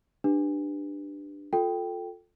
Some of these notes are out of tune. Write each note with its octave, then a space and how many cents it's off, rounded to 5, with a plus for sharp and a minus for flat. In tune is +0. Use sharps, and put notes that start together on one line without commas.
D4 +15 G4 +10 B4 +0
F4 +20 A4 +0 G5 +0